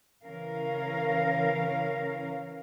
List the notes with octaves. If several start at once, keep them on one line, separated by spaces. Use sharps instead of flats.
C#3 E3 C#4 A#4 F5